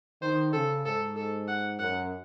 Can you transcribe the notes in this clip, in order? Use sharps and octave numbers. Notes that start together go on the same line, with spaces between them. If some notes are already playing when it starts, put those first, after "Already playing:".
D#3 C5
C#3 A4
G#2 A4
A4
F#5
F#2 F#5